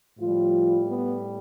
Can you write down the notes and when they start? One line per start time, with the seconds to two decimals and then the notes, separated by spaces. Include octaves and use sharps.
0.19 A2 F3 G3 F4
0.87 B3